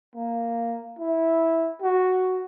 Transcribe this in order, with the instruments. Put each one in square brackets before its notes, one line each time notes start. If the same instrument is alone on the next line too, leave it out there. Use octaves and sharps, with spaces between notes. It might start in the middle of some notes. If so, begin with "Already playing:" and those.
[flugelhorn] A#3
E4
F#4